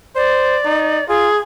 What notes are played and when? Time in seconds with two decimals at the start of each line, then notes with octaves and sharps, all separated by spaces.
0.16 C5 D5
0.65 D#4
1.08 F4 G#4